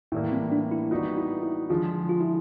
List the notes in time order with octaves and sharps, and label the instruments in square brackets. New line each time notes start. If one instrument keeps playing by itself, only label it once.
[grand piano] A2 E3 G3 A#3 [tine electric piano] E4
[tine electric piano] C4
D4
E4
[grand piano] G3 B3 D#4 F#4 B4 [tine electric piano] F4
[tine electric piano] E4
E4
[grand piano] D3 F3 G#3 [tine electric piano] F4
[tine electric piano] F4
E4